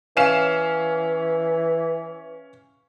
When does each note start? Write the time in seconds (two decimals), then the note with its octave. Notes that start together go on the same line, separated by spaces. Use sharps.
0.17 E3 C#4 F5 E7